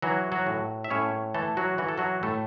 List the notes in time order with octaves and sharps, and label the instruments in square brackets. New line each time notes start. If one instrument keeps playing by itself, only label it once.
[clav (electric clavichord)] E3 F#3 F#4
F#3 F#4
A2
E5
A2 C#4 C#5
E3 A3 A4
F#3 F#4
E3 F#4
A4
F#3 F#4
A2 A3 A4